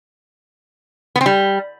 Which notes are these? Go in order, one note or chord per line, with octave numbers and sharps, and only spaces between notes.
B3
C4
G3